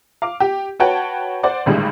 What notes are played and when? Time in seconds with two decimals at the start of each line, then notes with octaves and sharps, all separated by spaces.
0.22 F5 D6
0.40 G4
0.80 F#4 B4 C#5 F#5 G5 A5
1.43 C5 D5 F#5 D6
1.66 G#1 A2 D3 G3 G#3